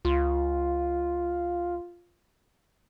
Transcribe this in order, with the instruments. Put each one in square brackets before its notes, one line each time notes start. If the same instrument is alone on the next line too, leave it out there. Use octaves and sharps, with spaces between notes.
[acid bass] C#2 [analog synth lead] F4